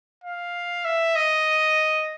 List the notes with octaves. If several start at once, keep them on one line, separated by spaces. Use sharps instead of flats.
F5
E5
D#5